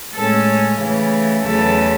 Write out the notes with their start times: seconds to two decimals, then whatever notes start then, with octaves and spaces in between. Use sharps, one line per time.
0.14 A2 G#3 C#4 A4
0.80 C#3 E3 A3
1.43 E2 C#3 F#3 A3 A4